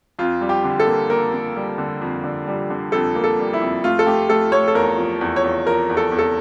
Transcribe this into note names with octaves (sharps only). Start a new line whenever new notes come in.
F2 F4
G3
G4
D3
A4
A#3
A#3 A#4
A#3
G3
D3
F2
D3
G3
D3
F2 A4
A#3
A4
G3
E4
F2
A3 F4
A4
A3 G4
A3 A4
A3 C#5
A4
E2 A#4
F3
E2
C#5
E2
F3 A#4
E2
A4
E2
A4